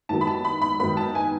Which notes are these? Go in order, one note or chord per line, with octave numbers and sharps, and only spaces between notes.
G#2 D#3 F#3 B3 A5
B5
A5
B5
B5
G#2 D#3 F#3 B3 B5
A5
G#5